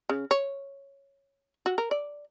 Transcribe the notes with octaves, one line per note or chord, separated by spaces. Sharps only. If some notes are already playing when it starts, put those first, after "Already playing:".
C#3
C#5
F#4
A#4
D5